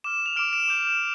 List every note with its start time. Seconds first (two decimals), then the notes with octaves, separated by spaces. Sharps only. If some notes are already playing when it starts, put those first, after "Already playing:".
0.04 D6 F6 E7
0.26 F7
0.36 D6 F6 D7
0.53 E7
0.68 D6 G6 F7